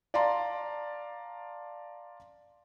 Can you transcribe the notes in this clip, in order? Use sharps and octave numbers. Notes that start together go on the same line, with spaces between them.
D5 F5 A5 A#5 C6